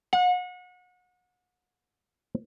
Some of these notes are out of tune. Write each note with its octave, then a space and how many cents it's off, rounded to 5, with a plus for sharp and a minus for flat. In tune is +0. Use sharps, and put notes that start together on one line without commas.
F#5 -35